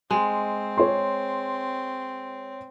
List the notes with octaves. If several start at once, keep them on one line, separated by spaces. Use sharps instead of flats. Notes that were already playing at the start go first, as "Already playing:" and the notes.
G#3 C4
C#5 C6